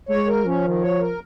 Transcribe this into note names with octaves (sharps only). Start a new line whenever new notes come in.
G#3 C#5
A#4
F3 C#4
D#3
C#5
A#4